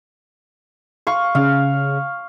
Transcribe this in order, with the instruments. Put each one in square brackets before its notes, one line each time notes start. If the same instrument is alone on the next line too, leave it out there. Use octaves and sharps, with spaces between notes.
[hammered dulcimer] F5 C#6
[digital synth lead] C#3 [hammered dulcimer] F5